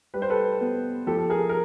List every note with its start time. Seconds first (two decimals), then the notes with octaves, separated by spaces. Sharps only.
0.14 G3 B4
0.22 C5
0.30 A4 B4
0.61 B3
1.07 F3 G4 A4
1.18 A4
1.30 G#4 A#4
1.49 A#4